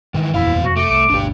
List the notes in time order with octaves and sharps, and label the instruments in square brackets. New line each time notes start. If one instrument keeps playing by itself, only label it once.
[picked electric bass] G#2 [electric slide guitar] D#3 E3
[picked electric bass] F#1 E2 A#2 [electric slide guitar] F#3 F5 [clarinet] E4
[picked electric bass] F1 [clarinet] F#4
[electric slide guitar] A3 [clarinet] D6
[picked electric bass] C2 [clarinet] D6
[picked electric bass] G1 D2 [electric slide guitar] D4 G4